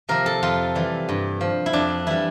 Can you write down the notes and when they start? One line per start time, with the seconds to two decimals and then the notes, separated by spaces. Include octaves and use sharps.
0.09 C3 F3 A#4
0.26 A4
0.43 F2 F4
0.75 E3 G3
1.09 G2
1.41 F3
1.66 E4
1.73 F2 D4
2.07 E3 G3 E4